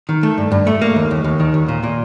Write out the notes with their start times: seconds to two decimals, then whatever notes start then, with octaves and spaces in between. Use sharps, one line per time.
0.09 D#3
0.23 A3
0.38 G2
0.52 G2
0.67 A3
0.82 A#3
0.96 D#2
1.11 D#2
1.24 D#2
1.40 D#3
1.54 D#2
1.68 A#2
1.83 A#2